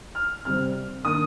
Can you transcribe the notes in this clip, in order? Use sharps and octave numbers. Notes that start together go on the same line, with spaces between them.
F6
C3 G3 C4 F6
D#3 A#3 D4 D#6